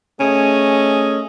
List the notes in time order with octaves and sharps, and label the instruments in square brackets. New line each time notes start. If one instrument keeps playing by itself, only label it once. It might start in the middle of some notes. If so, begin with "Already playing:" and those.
[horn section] A3 C#4 G#4 D#5